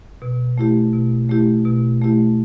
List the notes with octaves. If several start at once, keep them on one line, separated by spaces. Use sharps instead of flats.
B2
A3 E4 G4
B2
A3 E4 G4
B2
A3 E4 G4